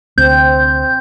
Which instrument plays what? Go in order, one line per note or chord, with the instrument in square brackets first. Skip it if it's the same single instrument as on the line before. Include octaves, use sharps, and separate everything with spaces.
[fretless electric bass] D2 [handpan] C4 [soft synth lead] G6